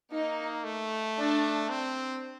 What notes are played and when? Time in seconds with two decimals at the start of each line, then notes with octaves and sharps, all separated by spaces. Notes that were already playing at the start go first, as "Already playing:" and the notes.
0.11 A#3 D#4
0.65 A3
1.17 D4
1.70 C4